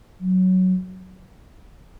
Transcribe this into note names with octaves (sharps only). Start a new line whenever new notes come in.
F#3